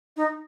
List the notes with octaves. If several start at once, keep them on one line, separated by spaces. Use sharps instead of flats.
D#4